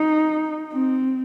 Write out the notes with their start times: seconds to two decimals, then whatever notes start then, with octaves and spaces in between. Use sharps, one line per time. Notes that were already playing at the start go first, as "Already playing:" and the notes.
Already playing: D#4
0.72 C4